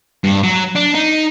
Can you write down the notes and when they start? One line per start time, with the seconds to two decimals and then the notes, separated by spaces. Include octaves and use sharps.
0.24 G2
0.44 F#3
0.76 D4
0.95 D#4